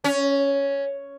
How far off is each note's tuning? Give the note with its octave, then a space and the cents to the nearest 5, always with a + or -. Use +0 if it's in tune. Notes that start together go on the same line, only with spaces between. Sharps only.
C#4 +5